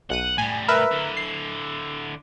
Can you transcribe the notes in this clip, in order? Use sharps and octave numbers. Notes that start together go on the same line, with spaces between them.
B1 F#5 F#6 D#7
A2 G3 G#5
A#4 B4 E5
D3 E4
C7